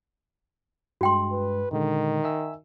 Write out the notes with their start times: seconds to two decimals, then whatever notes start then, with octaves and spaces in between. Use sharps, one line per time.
1.01 G2 G#3 F#4 G5 C6
1.32 B4
1.72 A#2 D3 D#3 G#3
2.24 E5 G#5 E6